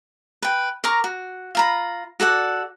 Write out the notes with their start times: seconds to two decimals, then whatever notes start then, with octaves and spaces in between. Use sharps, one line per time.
0.42 B4 G5
0.84 A#4 A#5 C#6 D6
1.04 F#4
1.55 F4 A#5 B5
2.20 F#4 A4 D5 F#5